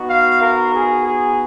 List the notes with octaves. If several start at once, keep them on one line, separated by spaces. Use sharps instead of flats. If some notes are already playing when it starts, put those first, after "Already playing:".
Already playing: B3 D#4 F#4
F5
A#4
G#4
G#4